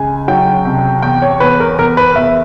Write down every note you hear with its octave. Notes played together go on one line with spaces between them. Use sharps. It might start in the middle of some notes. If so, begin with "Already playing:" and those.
Already playing: C#2 G#5
F#3 G5
C2
E2 G5
C#5
E2 B4
A#4
E2 A#4
B4
E2 E5